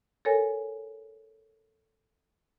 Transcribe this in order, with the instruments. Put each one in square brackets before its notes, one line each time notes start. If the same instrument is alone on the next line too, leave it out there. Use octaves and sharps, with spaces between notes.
[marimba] A4 A#4 C#5 G#5